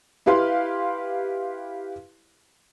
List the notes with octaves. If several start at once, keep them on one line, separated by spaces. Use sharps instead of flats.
E4 G4 B4 F5 C6